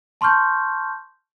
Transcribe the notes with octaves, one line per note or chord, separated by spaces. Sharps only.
A5 C6 C#6 F6 G6